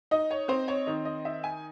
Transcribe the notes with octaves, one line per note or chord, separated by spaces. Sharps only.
D#4 D#5
C#5
C4 C5
C#5
D#3 D#5
D#5
D#4 E5
G#5